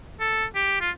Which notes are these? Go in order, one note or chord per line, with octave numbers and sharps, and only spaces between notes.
A4
G4
F4